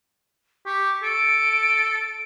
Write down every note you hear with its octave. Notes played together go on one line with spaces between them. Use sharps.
G4 C#6
A4 D7